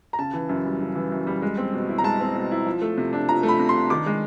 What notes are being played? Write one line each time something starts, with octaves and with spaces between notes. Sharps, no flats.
A#5
C#3 A5
E3
F#2
G3
C#3
E3
F#2
G3
G#3
C4
B2
E4
A#5
G#3 A5
C4
B2
E4
F3
A3
C3
D4
F3 A#5
A3
B5
C3
C6
D4
D#3 D6
G#3